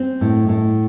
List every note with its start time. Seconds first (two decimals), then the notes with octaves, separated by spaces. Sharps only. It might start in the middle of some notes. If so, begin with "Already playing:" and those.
Already playing: C4
0.21 A2
0.49 A2